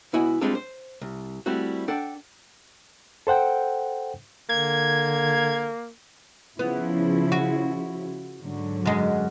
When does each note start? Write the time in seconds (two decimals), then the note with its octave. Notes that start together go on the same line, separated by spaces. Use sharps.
0.13 C#2 B3 E4 F#4 D#5 G#5
0.41 G3 G#3 C4 D4 F4 A4
0.55 C5
1.02 C2
1.46 G3 A3 C4 E4 F#4
1.88 D4 A4 F#5 G5
3.27 A4 C5 F#5 G5
4.49 D3 A#3 G#6
6.59 C#3 F3 B3 E4
7.32 F#4
8.43 G#2 D3 F#3
8.86 F#2 G#3